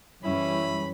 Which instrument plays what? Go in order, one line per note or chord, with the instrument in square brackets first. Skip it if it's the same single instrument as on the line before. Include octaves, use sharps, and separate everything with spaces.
[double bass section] F#2 E3 G3 [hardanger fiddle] C#4 [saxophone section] E4 [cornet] B5